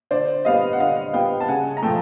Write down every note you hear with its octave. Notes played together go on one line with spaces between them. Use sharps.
D3 C5 D5
G3 B3 D#5 F5
F#5
D3 D#5 F5
G3 B3 F5 G5
A5
C#3 F#5 G#5
A#5
F3 A3 G5 A5